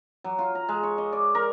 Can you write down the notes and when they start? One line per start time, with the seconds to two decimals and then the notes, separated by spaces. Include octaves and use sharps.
0.24 F#3
0.39 F4
0.55 A#5
0.69 G#3
0.83 C#6
0.98 D#5
1.13 D5
1.35 A#4